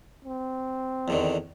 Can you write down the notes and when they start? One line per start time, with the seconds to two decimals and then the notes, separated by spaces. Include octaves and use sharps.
0.24 C4
1.08 E2 D3 D#3